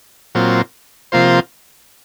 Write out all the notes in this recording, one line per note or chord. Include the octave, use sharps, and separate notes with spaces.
A#2 F#3 C4 F4
C3 F3 A#3 F4 C5